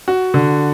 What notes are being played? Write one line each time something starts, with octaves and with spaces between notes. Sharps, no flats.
F#4
D3